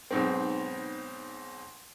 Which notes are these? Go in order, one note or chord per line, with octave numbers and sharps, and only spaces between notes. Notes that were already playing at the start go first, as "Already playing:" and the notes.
B1 G#2 C4